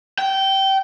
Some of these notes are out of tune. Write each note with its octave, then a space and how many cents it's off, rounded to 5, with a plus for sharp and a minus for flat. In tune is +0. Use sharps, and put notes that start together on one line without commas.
G5 -20